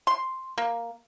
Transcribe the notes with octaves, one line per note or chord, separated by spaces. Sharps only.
C6
A#3